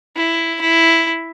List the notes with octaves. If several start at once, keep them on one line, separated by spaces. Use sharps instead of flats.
E4
E4